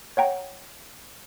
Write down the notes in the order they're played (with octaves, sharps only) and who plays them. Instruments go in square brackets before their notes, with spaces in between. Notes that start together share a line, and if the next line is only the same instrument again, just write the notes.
[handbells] C#5 F#5 G5 A#5